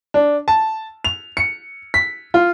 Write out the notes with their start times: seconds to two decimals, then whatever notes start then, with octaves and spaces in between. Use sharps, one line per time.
0.14 D4
0.48 A5
1.04 F7
1.37 C#7
1.94 B6
2.34 F4